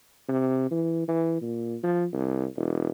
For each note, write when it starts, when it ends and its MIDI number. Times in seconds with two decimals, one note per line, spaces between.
0.28 0.69 48
0.71 1.07 52
1.08 1.38 52
1.41 1.75 46
1.83 2.05 53
2.12 2.45 36
2.56 2.89 28